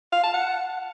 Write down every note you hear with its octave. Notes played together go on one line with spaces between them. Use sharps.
F5
A5
F#5